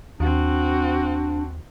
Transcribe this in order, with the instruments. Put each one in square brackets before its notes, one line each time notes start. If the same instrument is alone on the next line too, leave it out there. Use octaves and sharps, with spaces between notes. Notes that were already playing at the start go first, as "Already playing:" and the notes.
[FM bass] D#2 [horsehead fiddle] C4 F#4 [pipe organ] D4